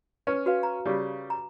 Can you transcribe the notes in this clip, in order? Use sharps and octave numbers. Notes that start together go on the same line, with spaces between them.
C#4 B4
F#4 B4 F5
A#5
C#3 G3
A#5